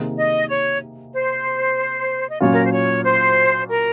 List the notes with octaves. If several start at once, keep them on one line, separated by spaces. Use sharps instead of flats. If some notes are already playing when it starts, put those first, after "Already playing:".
Already playing: C3 D#3 A#3 D#4 G#4
D#5
C#5
C5
D#5
A#2 F#3 C#4 F4 C#5
A#4
C5
C#5
C5
A#4